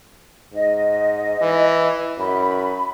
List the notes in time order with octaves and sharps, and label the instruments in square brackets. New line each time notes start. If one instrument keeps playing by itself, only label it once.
[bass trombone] G#2 [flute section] D#5
[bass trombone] E3
[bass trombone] F#2 [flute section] B5